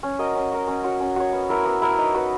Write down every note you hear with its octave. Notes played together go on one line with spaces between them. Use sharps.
C#4
F#4 A#4 D#5
C#4
F#4 A#4 D#5
C#4
F#4 C#5
C#4
F#4 C#5
B3
E4 A#4 E5
B3
E4 A#4 E5
D#4
F#4 B4